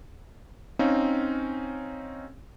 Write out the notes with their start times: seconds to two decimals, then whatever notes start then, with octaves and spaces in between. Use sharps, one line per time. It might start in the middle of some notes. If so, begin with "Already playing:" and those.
0.79 C4 C#4 D#4 F5